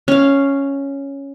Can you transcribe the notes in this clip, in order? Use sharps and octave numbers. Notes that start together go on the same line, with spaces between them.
C#4 F5